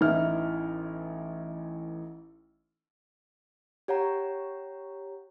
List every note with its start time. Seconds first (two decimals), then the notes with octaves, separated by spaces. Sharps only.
0.01 A1 E3 D#4 E4 F6
3.88 G4 C#5 F#5 A#5